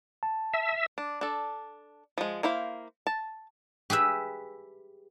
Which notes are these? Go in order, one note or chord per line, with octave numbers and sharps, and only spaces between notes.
A5
E5
D4
D4 A4
F3 G#3
A#3 E4 C5 F5
A5
G4 G#4 B4 E5